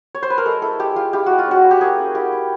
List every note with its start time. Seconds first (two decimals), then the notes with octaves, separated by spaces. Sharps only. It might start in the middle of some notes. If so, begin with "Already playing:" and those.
0.15 C#5
0.23 C5
0.30 B4
0.38 A#4
0.46 G#3 A4
0.62 E4 A4
0.79 G#3 G4
0.96 G#3 F4
1.13 E4 G4
1.26 G#3 F#4
1.39 F4
1.47 C#4 F#4
1.64 E4
1.71 G4
1.81 A#3 G#4
1.99 C#4
2.15 E4 G4
2.32 E4